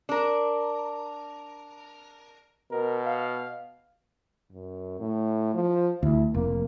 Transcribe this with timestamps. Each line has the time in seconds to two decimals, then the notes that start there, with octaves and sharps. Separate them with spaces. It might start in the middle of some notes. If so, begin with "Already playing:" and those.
0.09 D4 A#4
2.71 B2 A#4
3.06 F5
4.51 F#2
5.00 A2
5.54 F3
6.03 D2 E4
6.34 F1 A#3